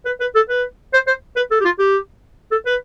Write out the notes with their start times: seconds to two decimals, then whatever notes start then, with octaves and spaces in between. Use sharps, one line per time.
0.05 B4
0.20 B4
0.35 A4
0.49 B4
0.93 C5
1.07 C5
1.36 B4
1.51 A4
1.61 G4
1.65 F4
1.79 G4
2.51 A4
2.66 B4